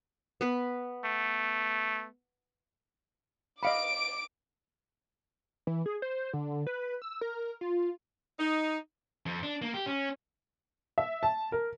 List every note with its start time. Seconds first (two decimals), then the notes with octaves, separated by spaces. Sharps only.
0.41 B3 B4
1.04 A3
3.63 D#5 F5 B5 D6 D7
5.67 E3
5.86 G#4
6.02 C5
6.33 D3
6.67 B4
7.02 E6
7.21 A#4
7.61 F4
8.40 D#4
9.26 F2
9.43 D4
9.62 A#3
9.74 G4
9.86 C#4
10.98 E5
11.23 A5
11.52 A#4